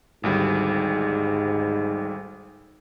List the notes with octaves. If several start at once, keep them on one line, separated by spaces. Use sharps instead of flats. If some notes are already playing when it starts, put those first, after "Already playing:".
G#1 D2 G#2 G3